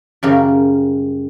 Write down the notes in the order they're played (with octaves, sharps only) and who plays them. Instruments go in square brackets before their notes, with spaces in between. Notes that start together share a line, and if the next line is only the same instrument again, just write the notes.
[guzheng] F#2 C#3 G3 A#4